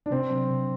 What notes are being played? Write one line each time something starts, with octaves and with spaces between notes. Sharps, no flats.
D4
C3 C4
F#3
C3